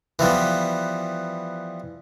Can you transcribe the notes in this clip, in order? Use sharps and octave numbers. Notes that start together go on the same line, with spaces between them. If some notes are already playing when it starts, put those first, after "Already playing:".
E3 F3 G3 B3